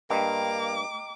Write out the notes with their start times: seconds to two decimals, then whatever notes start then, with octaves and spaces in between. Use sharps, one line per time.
0.10 G2 A#3 D#5 G5 A#5 D6